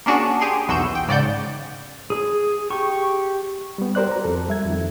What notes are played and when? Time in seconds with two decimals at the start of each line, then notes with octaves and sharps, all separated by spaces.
0.06 A#3 C#4 D4 F#4 G#4
0.41 G4 G#4 C6
0.68 B1 E2 F#4 E6 G6
0.95 G5
1.08 G#2 C#3 D5 F#5 G6
2.10 G#4
2.70 G4 C#6
3.78 G3 B3
3.95 G4 A#4 C5 D5 F#6
4.12 F#4 A#5
4.24 F2 A4
4.48 G3 E5 G#6
4.65 F2 D#3